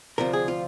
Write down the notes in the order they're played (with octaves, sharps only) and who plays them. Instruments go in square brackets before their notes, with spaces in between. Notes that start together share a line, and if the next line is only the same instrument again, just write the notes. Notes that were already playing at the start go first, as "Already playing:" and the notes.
[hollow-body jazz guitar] D2 C3 F3 A#4
G#4
F4